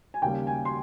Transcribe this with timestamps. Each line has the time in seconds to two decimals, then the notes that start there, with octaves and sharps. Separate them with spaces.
0.14 G#5
0.22 D#2 C#3 G3 A#3 G5
0.47 G#5
0.65 C6